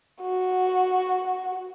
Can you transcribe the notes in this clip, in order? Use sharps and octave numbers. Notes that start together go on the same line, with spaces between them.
F#4